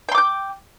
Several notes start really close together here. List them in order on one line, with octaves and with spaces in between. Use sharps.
G5 C6 D6 G6